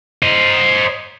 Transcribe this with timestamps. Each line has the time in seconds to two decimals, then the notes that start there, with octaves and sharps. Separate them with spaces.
0.22 C5 D#5